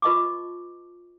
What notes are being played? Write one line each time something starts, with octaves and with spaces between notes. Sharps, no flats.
F4 B4 D#5 A5 C#6 D6